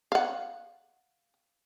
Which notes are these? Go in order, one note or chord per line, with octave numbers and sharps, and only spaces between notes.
F5 F#5